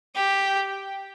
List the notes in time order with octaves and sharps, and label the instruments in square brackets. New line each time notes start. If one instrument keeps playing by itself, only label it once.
[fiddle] G4